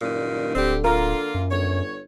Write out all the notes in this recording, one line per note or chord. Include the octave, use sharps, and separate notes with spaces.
F#1 G2 A#2 D#3
D1 D3 G3 C4 G4
A#3 F4 A#4
F#2
G1 C#5